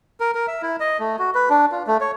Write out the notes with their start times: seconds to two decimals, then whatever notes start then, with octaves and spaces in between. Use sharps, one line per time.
0.20 A#4
0.35 A#4
0.48 E5
0.62 E4
0.80 D#5
1.00 A3
1.19 F#4
1.35 B4
1.50 D4
1.72 F4
1.87 A3
2.01 C#5